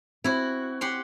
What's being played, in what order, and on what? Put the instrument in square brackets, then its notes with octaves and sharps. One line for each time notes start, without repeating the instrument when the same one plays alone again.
[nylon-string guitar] C4 [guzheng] E4 F#4
[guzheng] G4 F#5 C6